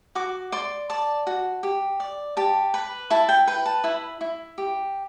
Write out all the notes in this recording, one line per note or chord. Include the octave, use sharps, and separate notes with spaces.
F#4 D6
D5 C6
D5 A5
F#4
G4
D5
G4 A5
B4 B5
E4 A5
G5
B4 G5
A5
E4 B5
E4
G4